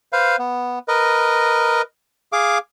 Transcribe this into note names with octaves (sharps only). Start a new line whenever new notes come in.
B4 C5 F5
B3
A#4 B4 D#5
G#4 F5 D6